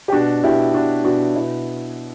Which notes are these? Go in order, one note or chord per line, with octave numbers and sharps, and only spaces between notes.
G4
B2 D4 F#4
B2 E4 G4
B2 D4 F#4
B2 D4 F#4
B2 E4